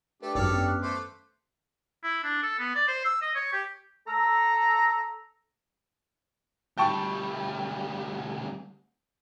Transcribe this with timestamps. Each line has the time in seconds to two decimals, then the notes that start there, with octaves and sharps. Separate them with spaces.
0.22 A3 D4 G4 B4
0.35 G#1 F#2 A4 C#5 D5 G5 F6
0.52 B3 C#4 B4
0.68 F#6
0.82 A3 C5 D6
2.03 E4
2.24 D4
2.42 A4
2.59 B3
2.75 D5
2.88 C5
3.05 E6
3.22 D#5
3.35 C#5
3.53 G4
4.08 A4 A#5
6.77 D2 G3 G5 A5 C#6